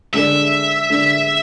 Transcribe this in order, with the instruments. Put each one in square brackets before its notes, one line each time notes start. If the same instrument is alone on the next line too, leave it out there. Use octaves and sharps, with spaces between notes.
[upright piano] D3 G#3 D4 A4 D5 [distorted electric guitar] E5
[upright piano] D3 G#3 D4 A4 D5